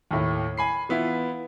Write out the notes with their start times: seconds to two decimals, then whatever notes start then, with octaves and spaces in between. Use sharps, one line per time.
0.11 D#2 A2
0.57 G#5 B5 C7
0.89 E3 B3 E4 F4